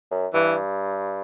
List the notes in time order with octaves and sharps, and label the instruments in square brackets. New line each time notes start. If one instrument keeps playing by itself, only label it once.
[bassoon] F#2
[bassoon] G2 [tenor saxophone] E3